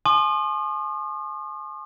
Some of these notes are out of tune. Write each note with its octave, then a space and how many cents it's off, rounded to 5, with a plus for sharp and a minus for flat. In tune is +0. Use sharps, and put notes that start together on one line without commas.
G#5 +40 C6 +35 D#6 -45